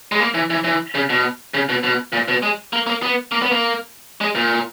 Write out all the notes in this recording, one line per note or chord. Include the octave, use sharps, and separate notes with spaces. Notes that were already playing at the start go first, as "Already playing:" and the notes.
G#3
A#3
E3
E3
E3
C#3
B2
C#3
B2
B2
A#2
B2
G#3
A#3
A#3
B3
A#3
B3
A#3
G#3
A#2